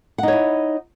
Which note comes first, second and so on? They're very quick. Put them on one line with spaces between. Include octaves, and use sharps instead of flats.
F#5 D#4 C#5 E4